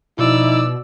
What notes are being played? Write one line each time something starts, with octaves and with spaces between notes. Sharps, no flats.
B2 F3 D#4 E4 D5 E6